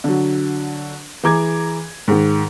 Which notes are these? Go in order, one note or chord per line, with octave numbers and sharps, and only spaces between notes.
D3 F#3
E3 G#4 A#5 D6 G#6
G#2 D#3